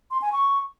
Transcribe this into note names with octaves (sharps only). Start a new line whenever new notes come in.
C6
G#5
C#6